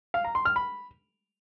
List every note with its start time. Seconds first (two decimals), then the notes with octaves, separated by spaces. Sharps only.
0.14 F5
0.25 A#5
0.35 C6
0.45 F6
0.56 B5